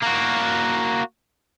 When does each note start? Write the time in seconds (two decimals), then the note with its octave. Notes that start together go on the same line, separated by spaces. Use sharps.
0.02 A#3 F#4